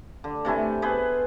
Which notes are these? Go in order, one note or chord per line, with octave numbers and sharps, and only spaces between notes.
D3
C3 A3 E4 G#5
B3 G#4 B4 C5